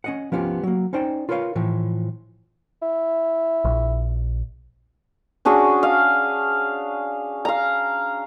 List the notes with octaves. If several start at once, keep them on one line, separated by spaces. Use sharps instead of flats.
C#4 D#5 F#5
F3 B3 C#4 F4 G4
F#3 A#3
C#4 D#4 C5 D5 G5
F4 A#4 B4 C#5 E5 F5
A2 E3 F3
E4
A#1
C#4 D4 F#4 G#4
F5
F5 A#5